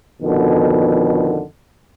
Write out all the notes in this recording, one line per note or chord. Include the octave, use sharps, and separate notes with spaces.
F2 B2 D3 D#3